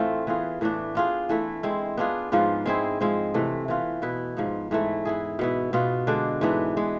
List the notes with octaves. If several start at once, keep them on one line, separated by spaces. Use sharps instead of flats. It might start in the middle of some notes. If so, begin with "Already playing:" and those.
Already playing: A2 E3 A3 C4 F4
E3 B3 F4 G#4
A2 E3 A3 D4
B3 F4 G#4
E3 A3 E4
G#3 C4 E4
B3 D4 F4 G#4
G#2 F3 B3 F4
G#3 C4 E4 G#4
F3 G#3 C4
C3 E3 A3
E3 B3 F4
B2 B3 E4 B4
G#2 F3 B3
G#2 E3 A3 E4
B3 E4 G#4
B2 B3 E4
B2 B3 F4
D3 G#3 D4
G#2 E3 B3 D4
G#3 B3